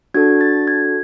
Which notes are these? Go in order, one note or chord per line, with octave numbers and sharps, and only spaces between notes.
D4 F#4 A4 G#6
A6
G#6